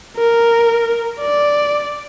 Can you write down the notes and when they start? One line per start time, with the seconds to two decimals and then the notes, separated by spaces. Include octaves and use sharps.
0.18 A#4
1.20 D5